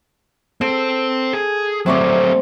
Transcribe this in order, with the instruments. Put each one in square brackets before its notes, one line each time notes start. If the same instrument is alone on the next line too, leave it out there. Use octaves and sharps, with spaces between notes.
[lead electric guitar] C4 C5 [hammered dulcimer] A4
[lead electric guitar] G#4
[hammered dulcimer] C3 C#5 D5 [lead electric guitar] F#3 A3